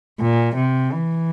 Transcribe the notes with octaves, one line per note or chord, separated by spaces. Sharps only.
A#2
C3
E3